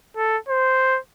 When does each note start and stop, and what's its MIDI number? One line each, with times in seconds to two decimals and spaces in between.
0.17 0.38 69
0.48 0.99 72